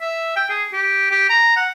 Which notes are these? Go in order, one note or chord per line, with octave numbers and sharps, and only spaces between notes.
E5
G5
G#4
G4
G4
A#5
F#5